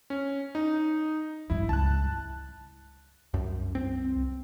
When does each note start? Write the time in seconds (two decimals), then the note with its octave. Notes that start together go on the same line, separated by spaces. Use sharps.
0.10 C#4
0.55 D#4
1.50 G#1 G2 E4
1.69 C#2 A5 F#6
3.34 C2 F#2
3.75 C4